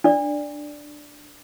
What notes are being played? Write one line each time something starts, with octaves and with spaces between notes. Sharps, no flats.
D4 D5